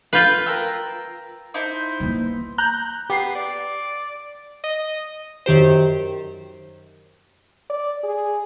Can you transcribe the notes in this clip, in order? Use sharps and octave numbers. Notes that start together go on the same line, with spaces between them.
F4 B4 F5 G6
A#4 G5 E6
D#4 E4 C5
E3 A#3
A#5 F#6 G6
B3 G4 C7
D5
D#5
F#2 D#3 G4 C5
D5
G#4